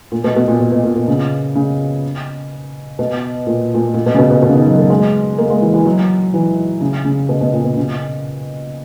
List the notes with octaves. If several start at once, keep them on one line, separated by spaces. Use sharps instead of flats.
A#2
B2
B2
A#2
B2
B2
A#2
A#2
C#3
C#3
B2
A#2
A#2
A#2
B2
C#3
B2
B2
B2
C#3
D#3
F#3
A#3
G#3
A#3
G#3
E3
E3
F#3
E3
C#3
C#3
B2
B2
A#2
B2
C#3